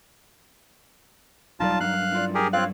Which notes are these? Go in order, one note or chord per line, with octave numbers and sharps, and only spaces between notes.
E1 F#3 G3 D#4 F4 D5 A5
G2 F#3 F5 F#6
E4 F4 D5
G4 G#4 A#4
C4 F4 C#5 F5 F#6